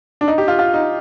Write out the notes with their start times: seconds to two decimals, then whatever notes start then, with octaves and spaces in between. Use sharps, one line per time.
0.21 D4
0.28 D#4
0.38 G4
0.48 F4
0.59 F4
0.74 D#4